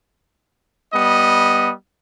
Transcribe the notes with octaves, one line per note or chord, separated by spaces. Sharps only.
G3 B3 D#5